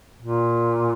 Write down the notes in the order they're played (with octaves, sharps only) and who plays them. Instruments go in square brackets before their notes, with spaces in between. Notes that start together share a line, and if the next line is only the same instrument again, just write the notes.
[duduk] A#2